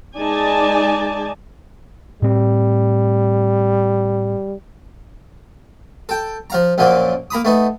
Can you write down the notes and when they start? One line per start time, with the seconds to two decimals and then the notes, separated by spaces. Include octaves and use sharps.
0.17 G#3 D#4 D5 G#5 A5
2.22 A2 G3 C4
6.09 A4 G5
6.50 F3 F5 A#5
6.78 F#2 A#2 F3 F#3 A#3
7.31 A#3 A#5 B5 D#6
7.45 A3 B3 D#4